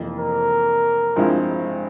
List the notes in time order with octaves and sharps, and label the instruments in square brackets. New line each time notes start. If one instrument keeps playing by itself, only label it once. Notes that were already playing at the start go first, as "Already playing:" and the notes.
Already playing: [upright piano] F1 F2 E3 A#3
[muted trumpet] A#4
[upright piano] G2 F3 G#3 C4 E4